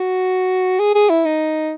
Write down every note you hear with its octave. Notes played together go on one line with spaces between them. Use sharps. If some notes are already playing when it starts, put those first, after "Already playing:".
Already playing: F#4
G#4
G#4
E4
D#4